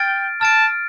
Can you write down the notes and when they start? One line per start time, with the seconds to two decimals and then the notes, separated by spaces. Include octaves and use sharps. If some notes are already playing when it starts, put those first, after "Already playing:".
Already playing: G5 F6 A6 D7
0.41 A5 F6 A6 D7